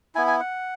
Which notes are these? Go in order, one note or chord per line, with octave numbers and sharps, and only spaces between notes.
B3 E4 G#5
G#5
F#5